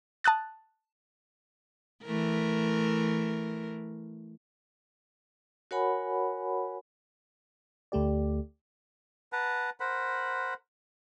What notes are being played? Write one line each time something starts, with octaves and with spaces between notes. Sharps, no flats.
A5 D#6 F#6 A6
E3 A3 A#4
F#4 A#4 C#5 F#5 G#5 B5
D2 A3 G4 D5
B4 F#5 A5 A#5
A#4 C5 F#5 B5